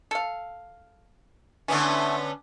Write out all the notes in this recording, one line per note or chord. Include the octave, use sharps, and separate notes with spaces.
A4 F5
D3 E3 A3 B3 C#4